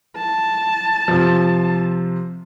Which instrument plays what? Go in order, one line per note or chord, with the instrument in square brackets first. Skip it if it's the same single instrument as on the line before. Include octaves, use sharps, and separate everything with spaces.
[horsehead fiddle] A5
[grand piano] C3 F3